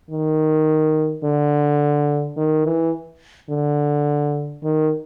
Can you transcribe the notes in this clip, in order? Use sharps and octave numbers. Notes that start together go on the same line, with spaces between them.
D#3
D3
D#3
E3
D3
D#3